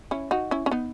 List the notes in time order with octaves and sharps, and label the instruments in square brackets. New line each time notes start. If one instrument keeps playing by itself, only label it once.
[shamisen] C#4 E4
D#4 F#4
C#4 E4
C#4
B3 D#4